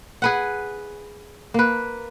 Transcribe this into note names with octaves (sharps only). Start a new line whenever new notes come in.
G#4 B4 F#5
A#3 B4